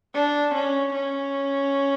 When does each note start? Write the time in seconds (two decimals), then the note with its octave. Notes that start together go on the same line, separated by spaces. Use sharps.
0.15 D4
0.54 C#4
0.94 C#4